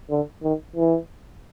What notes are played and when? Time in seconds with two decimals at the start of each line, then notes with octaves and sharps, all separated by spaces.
0.10 D3
0.43 D#3
0.76 E3